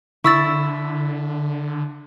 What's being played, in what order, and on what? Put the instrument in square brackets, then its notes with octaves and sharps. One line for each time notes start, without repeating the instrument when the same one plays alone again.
[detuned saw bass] D3 [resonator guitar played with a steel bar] E4 [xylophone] C#6 E6 A6